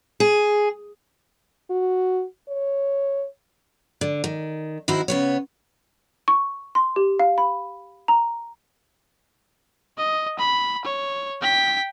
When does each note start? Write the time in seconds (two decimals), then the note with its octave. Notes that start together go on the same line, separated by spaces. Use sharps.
0.20 G#4
1.70 F#4
2.48 C#5
4.01 D3
4.24 D#3
4.88 D#3 C4 E4 F#4
5.08 C#3 B3 C#5
6.28 C#6
6.75 C6
6.96 G4
7.20 F5
7.38 B5
8.08 A#5
9.98 D#5
10.39 B5
10.85 C#5
11.42 G5 B6